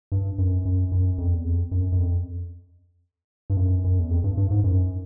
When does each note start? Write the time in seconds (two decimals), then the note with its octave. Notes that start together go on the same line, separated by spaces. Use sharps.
0.12 G2
0.38 F#2
0.65 F#2
0.92 F#2
1.18 F2
1.34 E2
1.45 F2
1.71 F#2
1.92 F#2
1.98 F2
3.50 G2
3.57 F#2
3.84 F#2
3.99 E2
4.11 F2
4.24 G2
4.37 G2
4.51 G#2
4.64 F#2